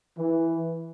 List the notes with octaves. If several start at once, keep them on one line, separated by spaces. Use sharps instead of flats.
E3